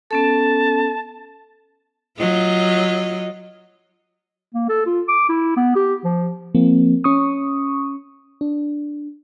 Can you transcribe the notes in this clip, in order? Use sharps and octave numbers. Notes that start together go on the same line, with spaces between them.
B3 C#4 A4 A5
F#3 F4 D#5
A#3
A4
F4
D6
E4
B3
G4
F3
F3 A#3 C4
C#4 C#6 D#6
D4